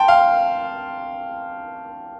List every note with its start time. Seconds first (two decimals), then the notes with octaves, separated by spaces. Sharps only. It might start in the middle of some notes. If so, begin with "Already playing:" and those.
Already playing: G5 A5 C6
0.08 F5